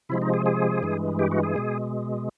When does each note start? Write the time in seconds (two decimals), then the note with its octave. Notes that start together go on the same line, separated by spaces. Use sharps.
0.09 C3 F3 G#3 E4
0.22 D#4
0.34 G#4
0.46 G#4
0.83 G2 E3 G#3
1.19 G4
1.31 F#4
1.43 G#4
1.56 B2 G#3